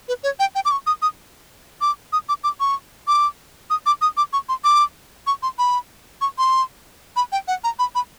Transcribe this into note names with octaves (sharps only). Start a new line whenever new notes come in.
B4
C#5
G5
G5
D6
C#6
D#6
D#6
D6
D#6
D6
D6
C#6
D6
D#6
D6
D#6
D6
C#6
C6
D6
C#6
C6
B5
C#6
C6
B5
G5
F#5
A#5
B5
B5